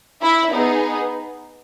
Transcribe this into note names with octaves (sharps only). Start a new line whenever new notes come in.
E4 E5
B3 D#4 G#4